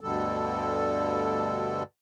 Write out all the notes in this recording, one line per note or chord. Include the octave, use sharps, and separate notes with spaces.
D2 G2 B2 D3 G3 A4